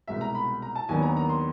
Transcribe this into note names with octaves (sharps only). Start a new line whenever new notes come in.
C2 B2 G#3 E5
A#5
B5
A#5
A5
D#2 D#3 F#3 B3 D4 G#5
A#5
A#5
C6